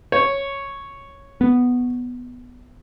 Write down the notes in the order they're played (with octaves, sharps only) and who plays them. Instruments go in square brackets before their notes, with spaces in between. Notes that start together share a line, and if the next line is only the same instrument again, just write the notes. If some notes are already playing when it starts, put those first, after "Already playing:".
[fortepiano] C#5
[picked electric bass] B3